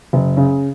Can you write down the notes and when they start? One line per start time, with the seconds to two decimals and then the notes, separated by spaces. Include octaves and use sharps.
0.13 F#1
0.37 C#3